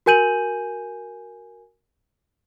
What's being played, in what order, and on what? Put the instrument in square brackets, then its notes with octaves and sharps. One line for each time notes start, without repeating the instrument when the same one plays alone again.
[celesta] F#4 A#4 G#5 G6 D#7 F#7